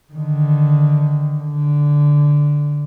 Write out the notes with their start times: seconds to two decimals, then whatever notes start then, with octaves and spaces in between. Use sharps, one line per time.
0.13 D3 D#3
1.40 D3